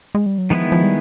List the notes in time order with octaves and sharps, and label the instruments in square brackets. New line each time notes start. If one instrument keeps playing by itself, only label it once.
[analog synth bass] G#3
G3
F#3
[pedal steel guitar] D#3 G#3 B3 E4 [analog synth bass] F3
[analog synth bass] F3
G3